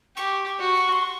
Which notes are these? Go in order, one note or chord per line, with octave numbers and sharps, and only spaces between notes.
G4 C#6
C#6
F#4
C#6
C6
C#6